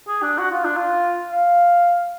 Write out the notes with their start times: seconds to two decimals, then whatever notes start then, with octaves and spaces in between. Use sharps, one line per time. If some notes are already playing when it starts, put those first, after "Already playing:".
0.08 G#4
0.22 D4
0.38 F#4
0.51 F4
0.65 D4
0.77 F4
1.31 F5